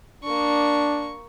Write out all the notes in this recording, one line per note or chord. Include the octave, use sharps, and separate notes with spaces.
A#3 D4 C#6